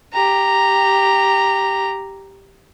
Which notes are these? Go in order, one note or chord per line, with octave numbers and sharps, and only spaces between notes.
G4 A#5